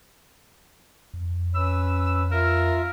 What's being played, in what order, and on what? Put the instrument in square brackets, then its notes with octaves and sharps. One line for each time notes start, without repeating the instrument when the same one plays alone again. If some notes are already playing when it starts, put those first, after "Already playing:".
[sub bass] F2
[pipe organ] C#4 B4 [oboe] E6
[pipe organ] F4 E5 [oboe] A#4